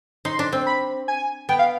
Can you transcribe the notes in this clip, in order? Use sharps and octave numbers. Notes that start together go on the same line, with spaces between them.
D#4 C6
D4
C4
B5
G#5
B3 G5
F5